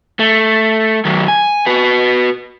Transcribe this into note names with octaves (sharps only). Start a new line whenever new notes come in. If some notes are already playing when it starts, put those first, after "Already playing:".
A3
D#3 F#3
G#5
F#4 B4